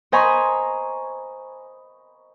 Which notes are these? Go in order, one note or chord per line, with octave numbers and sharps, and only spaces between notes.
C5 D#5 G#5 A#5 B5 C#6